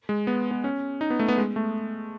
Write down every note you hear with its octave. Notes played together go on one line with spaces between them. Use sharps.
G#3
B3
B3
C#4
D#4
B3
A3
B3
G#3
A3